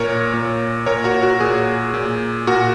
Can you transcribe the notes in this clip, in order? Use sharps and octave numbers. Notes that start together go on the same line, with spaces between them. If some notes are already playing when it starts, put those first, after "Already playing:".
Already playing: A#2 A#4 C#5
A#2
A#2 A#4 C#5
F#4 A#4
F#4 A#4
A#2 G#4
A#2
A#2 F#4 A#4